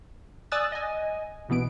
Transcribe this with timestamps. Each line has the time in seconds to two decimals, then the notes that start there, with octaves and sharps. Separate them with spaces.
0.52 D5 G#5 D#6 E6 F#6 A6
0.72 D#5 G#5
1.49 C2 B2 E3 B3 D7